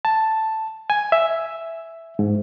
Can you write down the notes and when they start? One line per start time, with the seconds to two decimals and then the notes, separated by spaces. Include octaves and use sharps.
0.05 A5
0.90 G#5
1.12 E5
2.19 G#2